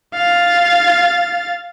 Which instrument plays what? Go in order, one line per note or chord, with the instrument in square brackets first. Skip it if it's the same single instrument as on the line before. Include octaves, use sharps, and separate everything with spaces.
[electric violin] F5 A6